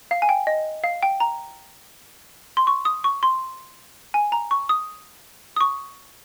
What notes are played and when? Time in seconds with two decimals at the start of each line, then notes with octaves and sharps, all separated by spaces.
0.11 F5
0.22 G#5
0.29 G5
0.47 D#5
0.84 F5
1.03 G5
1.20 A#5
2.57 C6
2.67 C#6
2.85 D#6
3.04 C#6
3.23 C6
4.14 G#5
4.32 A#5
4.51 C#6
4.69 D#6
5.56 D#6
5.61 C#6